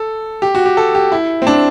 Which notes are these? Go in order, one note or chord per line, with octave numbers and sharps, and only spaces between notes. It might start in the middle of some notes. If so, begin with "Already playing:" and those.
Already playing: A4
G4
F#4
G4
A4
G4
E4
C4
D4